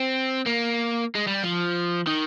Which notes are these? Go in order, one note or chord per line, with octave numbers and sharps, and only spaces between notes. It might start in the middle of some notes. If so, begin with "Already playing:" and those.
Already playing: C4
A#3
G#3
G3
F3
D#3